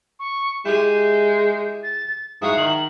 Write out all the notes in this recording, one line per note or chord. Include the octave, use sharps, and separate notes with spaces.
C#6
G#3 E4 G4 G#4 G6
A6
G#2 E4 F#4 F5 D#6
D#3 F#7